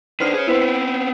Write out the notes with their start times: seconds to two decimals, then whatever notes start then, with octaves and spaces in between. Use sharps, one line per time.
0.20 D#3 D4 B4 C5 F6
0.34 G#4 C#5
0.48 B3 C4 E4 B4 C5